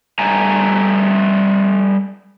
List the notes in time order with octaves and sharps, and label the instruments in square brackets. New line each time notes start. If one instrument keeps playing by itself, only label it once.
[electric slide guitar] G3 A3 G#5 A#5